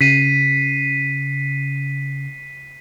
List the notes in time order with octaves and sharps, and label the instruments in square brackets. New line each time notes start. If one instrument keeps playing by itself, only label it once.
[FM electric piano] C#3 [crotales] B6 C7 D#7